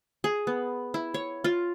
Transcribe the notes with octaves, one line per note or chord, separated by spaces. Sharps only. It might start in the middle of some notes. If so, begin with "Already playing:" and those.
G#4
B3
E4
C#5
F4